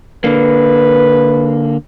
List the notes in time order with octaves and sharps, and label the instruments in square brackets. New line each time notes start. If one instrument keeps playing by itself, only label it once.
[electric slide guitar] D3 A#3 [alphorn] B4